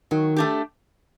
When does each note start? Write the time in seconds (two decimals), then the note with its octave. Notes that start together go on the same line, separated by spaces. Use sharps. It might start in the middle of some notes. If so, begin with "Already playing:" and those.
0.11 D#3 F#3
0.37 A3 D4 G4